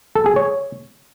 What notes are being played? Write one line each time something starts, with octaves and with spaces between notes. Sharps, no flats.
A4
G#4
C#5